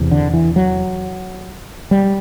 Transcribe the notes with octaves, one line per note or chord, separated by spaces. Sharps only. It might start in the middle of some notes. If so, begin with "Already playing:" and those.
Already playing: E2 C3
D3
E3
F#3
G3